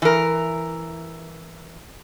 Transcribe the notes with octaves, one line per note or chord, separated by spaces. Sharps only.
E3 A#4